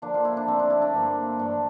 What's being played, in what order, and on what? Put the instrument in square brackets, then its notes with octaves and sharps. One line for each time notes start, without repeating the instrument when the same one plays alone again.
[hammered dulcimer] D3 F3 A#3 D4
F4
E4
D4
D3 A3 C4
D4
E4
D4
G2 F3 A#3
G2 E3 A3 D4